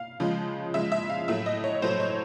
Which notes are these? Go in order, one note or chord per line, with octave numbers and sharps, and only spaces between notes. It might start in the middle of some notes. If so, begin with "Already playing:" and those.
Already playing: F5
C#3 F3 G#3
C#3 F3 G#3 E5
E5
F5
A2 F#3 A3 E5
D#5
C#5
A2 F#3 A3 C5
C#5